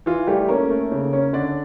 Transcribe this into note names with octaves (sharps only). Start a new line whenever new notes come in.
E3 F4
G3 A3 G4
A#3 C#4 A#4
A3
C#3
C#4
D3 D4 D5